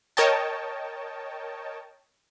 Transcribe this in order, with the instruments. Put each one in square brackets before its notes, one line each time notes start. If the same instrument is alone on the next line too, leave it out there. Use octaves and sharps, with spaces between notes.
[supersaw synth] A#4 C#5 D#5 G5 A5